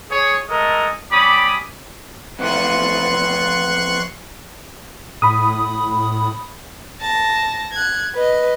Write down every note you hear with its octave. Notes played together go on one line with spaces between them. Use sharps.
G#4 C#5
G#3 A3 A4 A#4 D#5
G3 C#4 B5 D6 D#6
F2 E3 A3 C6 C#6 F#6
A2 B5 D#6
A5 A#6
F#6 G#6
B4 D#5